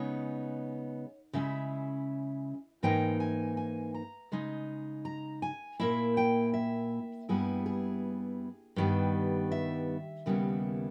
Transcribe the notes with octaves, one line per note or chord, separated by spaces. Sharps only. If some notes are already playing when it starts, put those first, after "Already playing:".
Already playing: C#3 G#3 B3 D#4 C#5
C#3 G#3 C#4 E4 E5
G#2 E3 A#3 D#4 G5
G#5
G#5
A#5
C#3 G#3 D#4
A#5
G#5
A#2 A#3 E4 E5
G5
E5
G2 G3 B3 E4 G#4
G#4
G2 D#3 G3 B3
E5
D#2 C#3 G3 B3 E4